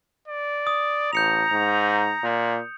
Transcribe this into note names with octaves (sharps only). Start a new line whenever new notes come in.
D5
D#6
A1 A#5 G6 C#7 F7
G#2
A#2